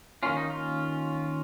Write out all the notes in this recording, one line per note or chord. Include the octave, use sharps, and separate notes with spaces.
D#3 A#3 C#4 F4
D#4
F4